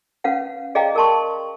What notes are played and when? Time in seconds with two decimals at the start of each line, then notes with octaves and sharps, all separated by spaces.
0.24 C#4 B4 F5 F#5
0.75 G#4 D5 D#5 F5 G5 A#5
0.95 G#4 A#4 D5 A5 C6 C#6